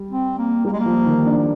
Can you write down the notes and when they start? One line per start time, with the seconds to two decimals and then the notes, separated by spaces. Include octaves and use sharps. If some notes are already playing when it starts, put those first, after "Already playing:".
Already playing: G3
0.11 C4
0.38 A#3
0.65 G3 A#3
0.73 G#3
0.79 A#3
0.86 F3
1.06 D#3
1.26 D4
1.38 A#3